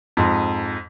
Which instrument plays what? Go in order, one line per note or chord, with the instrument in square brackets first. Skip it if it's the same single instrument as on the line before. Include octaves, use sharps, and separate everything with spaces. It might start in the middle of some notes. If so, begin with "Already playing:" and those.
[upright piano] F2 G#2